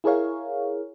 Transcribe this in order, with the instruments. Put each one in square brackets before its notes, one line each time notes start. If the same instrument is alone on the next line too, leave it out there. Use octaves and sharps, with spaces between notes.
[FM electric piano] E4 G#4 A#4 C#5 F5